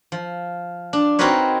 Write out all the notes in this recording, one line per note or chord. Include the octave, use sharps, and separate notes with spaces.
F3
D4
C4 D#4 F#4 A#4 B4 C#5